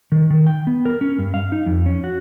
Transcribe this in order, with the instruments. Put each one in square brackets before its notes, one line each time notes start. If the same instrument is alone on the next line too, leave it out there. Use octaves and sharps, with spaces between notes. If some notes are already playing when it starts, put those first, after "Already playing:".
[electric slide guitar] D#3
D#3
G5
B3
A#4
C#4
G2
F5
D#4
F2
C#4
F#4